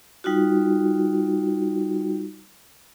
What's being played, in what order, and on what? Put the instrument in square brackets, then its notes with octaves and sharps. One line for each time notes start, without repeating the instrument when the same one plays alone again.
[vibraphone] G3 D#4 F4 F#4